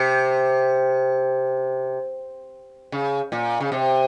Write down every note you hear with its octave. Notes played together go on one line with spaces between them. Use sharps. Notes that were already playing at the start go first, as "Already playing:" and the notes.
Already playing: C3
C#3
A#2
C#3
C3